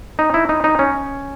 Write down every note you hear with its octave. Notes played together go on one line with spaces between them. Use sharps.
D#4
E4
D#4
D#4
C#4